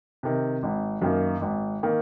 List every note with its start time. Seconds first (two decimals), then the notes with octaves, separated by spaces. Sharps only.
0.23 C3 D#3
0.63 G#1
1.02 F#2 D#3 A#3
1.41 G#1
1.83 D#3 A#3